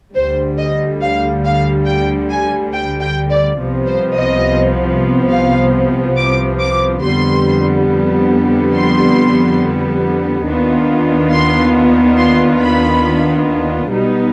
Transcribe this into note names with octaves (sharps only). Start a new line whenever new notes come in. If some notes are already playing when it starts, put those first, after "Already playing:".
D2 D3 G3 C5
D#5
F5
F5
G5
G#5
G5
G5
D5
C2 C3 F3 B3
C5
D#5
F5
D6
D6
F2 D3 G3 B3 C6
C6
D#2 D#3 B3 D4 F4
C6
C6
B5
B1 B2 G3 B3 D#4